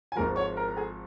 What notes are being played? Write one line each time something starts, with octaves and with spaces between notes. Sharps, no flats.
G#5
G#1 G#2 F3 A#4 A#5
C#5 C#6
A#4 A#5
A#5
G#4 G#5